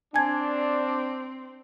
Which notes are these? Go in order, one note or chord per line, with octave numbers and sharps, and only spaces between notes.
C4 D4 G#5 A5 G#6